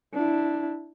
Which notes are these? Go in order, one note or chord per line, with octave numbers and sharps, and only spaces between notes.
D4 E4